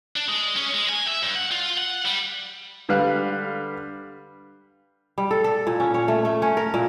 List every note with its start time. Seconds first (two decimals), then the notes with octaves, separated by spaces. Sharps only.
0.16 D4
0.28 G#3
0.56 C#4
0.74 G#3
0.89 G#5
1.07 E5
1.23 G2
1.35 F#5
1.51 F4
1.78 F#5
2.05 G3
2.89 D3 G3 B4 F5 F#6
5.18 G3
5.31 A4
5.44 A4
5.67 A#2
5.80 C#4
5.94 C#5
6.08 A3
6.25 A3
6.42 C#4
6.57 A#4
6.74 A#2